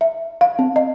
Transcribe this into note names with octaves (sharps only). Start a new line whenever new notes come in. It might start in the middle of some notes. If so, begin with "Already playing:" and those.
E5
F5
C4
D#5